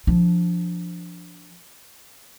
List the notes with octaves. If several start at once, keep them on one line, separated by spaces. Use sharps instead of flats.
F3 D4